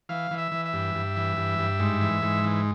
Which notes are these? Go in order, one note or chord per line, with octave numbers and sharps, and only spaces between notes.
E3 F5
E3
E5
E3
E5
G2
G2
E3
G2
G2
G#2
E3
G#2
E3